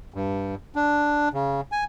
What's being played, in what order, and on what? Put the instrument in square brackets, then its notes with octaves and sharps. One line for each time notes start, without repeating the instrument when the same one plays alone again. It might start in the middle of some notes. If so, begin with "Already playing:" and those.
[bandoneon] G2
D4
C#3
G#5